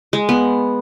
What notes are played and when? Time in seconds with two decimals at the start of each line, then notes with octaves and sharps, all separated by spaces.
0.13 G#3
0.29 B3